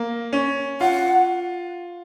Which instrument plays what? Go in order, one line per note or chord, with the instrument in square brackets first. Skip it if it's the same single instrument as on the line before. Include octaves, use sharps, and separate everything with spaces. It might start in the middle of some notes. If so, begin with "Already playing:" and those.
Already playing: [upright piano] A#3
C#4
[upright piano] F4 [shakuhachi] F#5